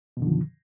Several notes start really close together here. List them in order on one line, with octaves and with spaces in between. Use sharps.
B2 F#2 D3 D#3 F3